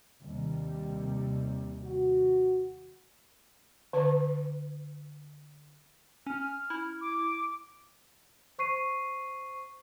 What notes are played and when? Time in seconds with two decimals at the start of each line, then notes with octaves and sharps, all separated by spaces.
0.22 D#2 C3 G3
1.83 F#4
3.93 D3 B4 A5
6.27 C#4 F6
6.70 E4
7.01 D6
8.58 C5 C#6 C7 D#7